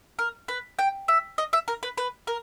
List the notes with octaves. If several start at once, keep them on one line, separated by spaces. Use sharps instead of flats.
A#4
B4
G5
E5
D#5
E5
A#4
B4
B4
A#4